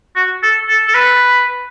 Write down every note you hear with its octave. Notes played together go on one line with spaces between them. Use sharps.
F#4
A4
A4
A4
B4